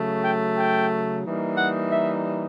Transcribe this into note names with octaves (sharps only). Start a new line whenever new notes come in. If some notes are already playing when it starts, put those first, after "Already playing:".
Already playing: C#3 F#3 A3
G5
G5
E3 G3 A#3 D#4
F#5
E5